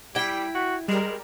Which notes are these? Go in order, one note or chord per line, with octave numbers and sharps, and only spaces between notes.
G3 E4 G5 B6 D7
F#4
G3 G#3 A#4